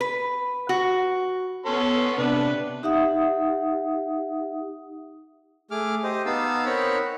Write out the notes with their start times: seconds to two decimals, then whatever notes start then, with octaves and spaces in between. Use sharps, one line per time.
0.01 B4
0.69 F#4
1.65 B3 C#4 A4 C6
2.18 C3 D4 B4
2.83 D#4 G4 E5 F#5 D#6
5.71 A3 G#4 D6 F6
6.04 G4 C5 D#5
6.26 B3 D#4 F5 A5 E6
6.65 C4 D#4 A#4 C#5 F#5 B5